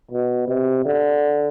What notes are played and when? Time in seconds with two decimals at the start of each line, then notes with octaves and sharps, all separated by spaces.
0.11 B2
0.48 C3
0.85 D3